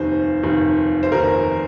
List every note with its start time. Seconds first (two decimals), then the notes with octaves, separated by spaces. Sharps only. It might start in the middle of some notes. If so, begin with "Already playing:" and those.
Already playing: F1 D#2 D#3 C5
0.43 F1 D#2 D#3
1.03 C5
1.12 F1 D#2 D#3 A#4